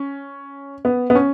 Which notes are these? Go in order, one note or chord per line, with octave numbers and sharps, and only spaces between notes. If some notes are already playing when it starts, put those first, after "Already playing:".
Already playing: C#4
B3
B3
C#4